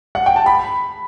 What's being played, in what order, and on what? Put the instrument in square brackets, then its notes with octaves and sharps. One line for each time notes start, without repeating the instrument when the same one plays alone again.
[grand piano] F#5
G5
A5
B5